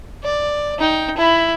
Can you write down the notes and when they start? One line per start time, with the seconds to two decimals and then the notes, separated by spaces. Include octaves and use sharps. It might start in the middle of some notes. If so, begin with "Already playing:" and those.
0.24 D5
0.79 D#4 G5
1.17 E4 B5